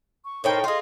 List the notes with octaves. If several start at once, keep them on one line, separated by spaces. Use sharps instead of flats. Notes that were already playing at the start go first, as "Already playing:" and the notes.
C#6
A2 D#4 A#4 C5 C#5 G5
F4 G#4 D#5 C6